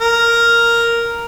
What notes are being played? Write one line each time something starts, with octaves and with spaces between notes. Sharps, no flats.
A#4